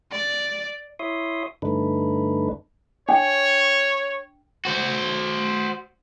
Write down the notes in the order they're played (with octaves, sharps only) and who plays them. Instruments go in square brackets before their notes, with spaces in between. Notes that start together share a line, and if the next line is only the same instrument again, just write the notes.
[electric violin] D5
[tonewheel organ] E4 C#5 E5 C6 D#6
G2 D3 A3 D4 D#4 B4
[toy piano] D4 G5 [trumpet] C#5
[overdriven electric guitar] F#4 C5